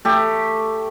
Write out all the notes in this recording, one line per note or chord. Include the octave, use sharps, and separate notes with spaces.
A3 G4